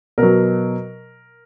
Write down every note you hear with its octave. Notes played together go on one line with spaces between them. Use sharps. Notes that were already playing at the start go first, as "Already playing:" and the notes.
B2 F#3 A#4